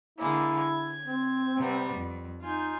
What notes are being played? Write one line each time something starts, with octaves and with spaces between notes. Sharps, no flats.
D3 G#3 A#3 E4
G#6
C4
C3 G3 B3
F2
D#4 F4 G#5 G6